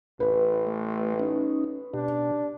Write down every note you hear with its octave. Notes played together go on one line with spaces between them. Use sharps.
A1 B4
A3
C#4 D#4
B2 D4 G4